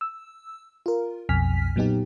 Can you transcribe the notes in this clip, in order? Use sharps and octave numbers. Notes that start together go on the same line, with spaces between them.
E6
F4 A#4
B1 F2 B2 G#5 F6 B6
A#2 F#3 B3 D#4 G4